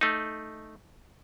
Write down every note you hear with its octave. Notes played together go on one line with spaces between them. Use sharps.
A3 D#4